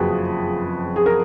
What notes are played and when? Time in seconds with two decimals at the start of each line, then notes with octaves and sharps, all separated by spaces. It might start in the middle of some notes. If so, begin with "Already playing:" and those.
Already playing: F#1 F2 F3 F#4 G#4 B4
0.96 G#4
1.06 A#4